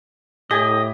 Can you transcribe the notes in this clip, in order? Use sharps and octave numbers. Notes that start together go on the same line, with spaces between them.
A2 G4 D#5 G#5